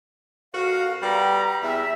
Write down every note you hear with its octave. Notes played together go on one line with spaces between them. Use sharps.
F2 F#4 A#4 F5
G3 B3 G5 A#5
E2 E5